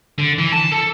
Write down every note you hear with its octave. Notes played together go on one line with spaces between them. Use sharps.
D3
E3
A5
A4